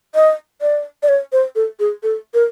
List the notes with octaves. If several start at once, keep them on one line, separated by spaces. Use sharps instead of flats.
D#5
D5
D5
C#5
C5
A4
G#4
A4
A#4